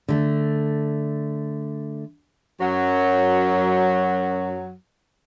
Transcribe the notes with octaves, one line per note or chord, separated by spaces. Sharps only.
D3 A3
F#2 F#3